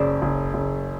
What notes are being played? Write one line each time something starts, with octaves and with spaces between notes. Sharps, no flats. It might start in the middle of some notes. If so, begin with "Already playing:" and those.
Already playing: F#1 C#3 C5 D5
F#1
F#1